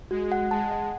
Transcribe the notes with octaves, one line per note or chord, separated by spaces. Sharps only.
G#3 F#4
F#5
G#3 A5
F#5